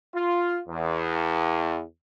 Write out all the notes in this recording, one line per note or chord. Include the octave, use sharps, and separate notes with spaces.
F4
E2